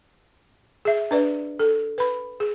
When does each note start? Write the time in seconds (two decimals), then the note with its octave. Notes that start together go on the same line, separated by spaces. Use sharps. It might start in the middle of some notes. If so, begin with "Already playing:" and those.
0.85 G#4 E5
1.11 D4 B4 D5
1.60 A4
1.98 B4 B5
2.40 G#4